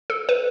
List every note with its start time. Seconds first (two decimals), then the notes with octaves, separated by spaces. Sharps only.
0.10 A4
0.29 B4